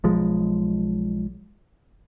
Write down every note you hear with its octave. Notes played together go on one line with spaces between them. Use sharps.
B1 F3 G#3